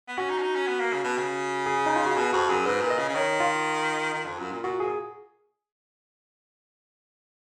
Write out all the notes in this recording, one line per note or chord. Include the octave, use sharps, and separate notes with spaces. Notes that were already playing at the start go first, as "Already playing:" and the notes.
B3
C#4 F#4
D#4
C#4
D#4
C#4
B3
A#3
C#3
B2
C#3
G#4
D#4
F4
F#4
B2 G#4
F2 F#4
F#2 G#4
G#2 B4
A#2
D#5
C#3
C#3
D#3 C#5
F4
D#3
F2
F#2
A#2
A#2 F#4
A#2 G#4